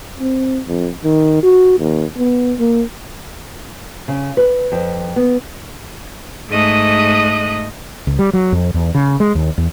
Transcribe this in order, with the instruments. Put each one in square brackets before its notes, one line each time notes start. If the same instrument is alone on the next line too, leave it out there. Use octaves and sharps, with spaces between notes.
[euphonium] C4
F2
D#3
F#4
D#2
B3
A#3
[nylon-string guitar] C#3
B4
F2
B3
[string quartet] G#2 A3 D#5 D#6 F#6
[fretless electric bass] C#2
G3
F#3
F2
E2
C#3
G#3
D#2
E2